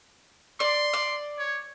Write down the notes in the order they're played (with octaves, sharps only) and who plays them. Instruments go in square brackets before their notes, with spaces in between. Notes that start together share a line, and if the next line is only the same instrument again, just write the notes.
[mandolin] D5 [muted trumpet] C6
[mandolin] D5
[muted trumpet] C#5